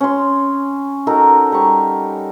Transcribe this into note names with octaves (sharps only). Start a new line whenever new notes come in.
C#4 C6
D#4 F#4 A4 A#4
G3 A#5 C#6